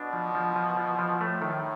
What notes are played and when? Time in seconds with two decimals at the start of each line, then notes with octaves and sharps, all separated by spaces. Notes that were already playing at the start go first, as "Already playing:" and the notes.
Already playing: B2 D4
0.13 F3
0.35 F3
0.56 F3
0.77 F3
0.99 F3
1.21 A2 A3
1.42 D#3